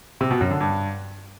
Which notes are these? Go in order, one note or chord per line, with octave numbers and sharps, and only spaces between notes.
C3
B2
F#2
D3
G2